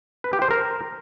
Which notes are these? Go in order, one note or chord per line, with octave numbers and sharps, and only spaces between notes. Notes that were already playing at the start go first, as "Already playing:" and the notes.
B4
G4
C5
A#4